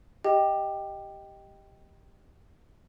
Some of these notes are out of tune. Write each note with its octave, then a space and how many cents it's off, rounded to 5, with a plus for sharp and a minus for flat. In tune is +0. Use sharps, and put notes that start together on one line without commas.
G4 +0 D#5 +0 G5 +0